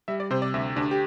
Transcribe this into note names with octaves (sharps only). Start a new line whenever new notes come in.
G3 E5
D5
C3 C5
D5
D2 E5
D2 D4
G4